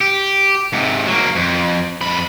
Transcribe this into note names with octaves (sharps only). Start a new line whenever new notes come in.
G4
G#2 C3
F#3 A#3
F2
F2 B5